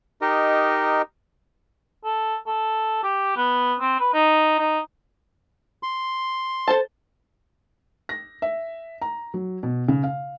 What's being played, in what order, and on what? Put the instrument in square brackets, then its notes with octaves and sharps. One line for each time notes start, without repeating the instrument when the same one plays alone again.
[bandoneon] D#4 G4 A#4 D#5
[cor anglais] A4
A4
G4
B3
C4
B4
D#4
D#4
[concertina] C6
[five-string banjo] A4 C5 A5
[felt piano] A#6
E5
A#5
F#3
B2
C#3
F5